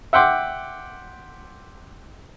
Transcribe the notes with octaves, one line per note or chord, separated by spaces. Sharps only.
E5 F#5 G5 C6 D6